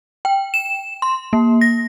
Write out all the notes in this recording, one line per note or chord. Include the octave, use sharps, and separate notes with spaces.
G5
E7
C6
A#3
A#6